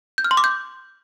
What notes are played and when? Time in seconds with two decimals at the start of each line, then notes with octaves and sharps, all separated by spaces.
0.18 G6
0.24 F6
0.31 C6
0.37 D6
0.44 G6